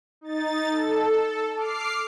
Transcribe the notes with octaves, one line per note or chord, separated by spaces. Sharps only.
D#4 A6
A4
D6 F6 C7